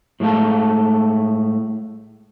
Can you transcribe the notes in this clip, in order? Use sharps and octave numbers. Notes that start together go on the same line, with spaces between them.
A2 G#3 A3 F5 A5